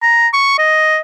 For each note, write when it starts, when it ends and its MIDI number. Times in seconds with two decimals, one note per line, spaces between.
0.02 0.28 82
0.33 0.57 85
0.58 0.99 75